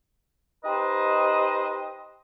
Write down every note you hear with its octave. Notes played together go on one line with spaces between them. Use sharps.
D#4 G4 B4 C5 D#5